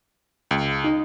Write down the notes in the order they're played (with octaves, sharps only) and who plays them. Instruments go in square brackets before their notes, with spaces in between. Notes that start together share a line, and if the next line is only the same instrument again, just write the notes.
[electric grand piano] C#2
[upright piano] D#4